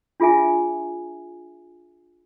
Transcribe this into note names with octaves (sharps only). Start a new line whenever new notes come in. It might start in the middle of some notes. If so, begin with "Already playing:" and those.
D4 F4 G#4 E5 G#5